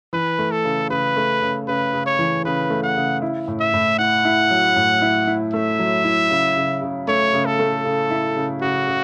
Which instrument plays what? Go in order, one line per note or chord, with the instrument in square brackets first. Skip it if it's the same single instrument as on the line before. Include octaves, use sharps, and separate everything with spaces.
[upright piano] E3 [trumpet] B4
[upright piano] A3
[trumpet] A4
[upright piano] C#3
[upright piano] C#3 [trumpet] B4
[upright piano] A3
C#3
[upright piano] C#3 [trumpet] B4
[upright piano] C#3
[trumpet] C#5
[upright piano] E3
[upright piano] C#3 [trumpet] B4
[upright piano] A3
[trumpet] F#5
[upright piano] C#3
E4
A2
[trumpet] E5
[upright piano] A2
[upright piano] E4 [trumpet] F#5
[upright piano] E4
F#3
A2
E4
E4
[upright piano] A3 [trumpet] E5
[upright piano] F#3
E4
C#3
C#3
C#3
[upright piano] A3 [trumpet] C#5
[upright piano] C#3
[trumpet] A4
[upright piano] A3
C#3
E4
C#3
[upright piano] C#3 [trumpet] F#4
[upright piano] C#3